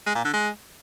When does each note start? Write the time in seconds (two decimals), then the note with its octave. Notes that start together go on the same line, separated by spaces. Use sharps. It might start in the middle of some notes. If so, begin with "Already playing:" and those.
0.07 G#3
0.16 A#2
0.25 D3
0.34 G#3